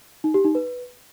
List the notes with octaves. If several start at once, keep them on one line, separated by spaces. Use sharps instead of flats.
D#4
G4
D#4
B4